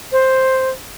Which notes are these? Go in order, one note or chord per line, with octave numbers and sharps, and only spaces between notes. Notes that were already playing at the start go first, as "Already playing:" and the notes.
C5